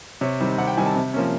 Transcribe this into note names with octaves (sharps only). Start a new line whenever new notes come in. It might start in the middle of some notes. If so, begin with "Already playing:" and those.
C3 C#5
D#3 G3 C4
C3 F#5
G5
D#3 G3 C4 G#5
A5
C3
F3 A#3 C#4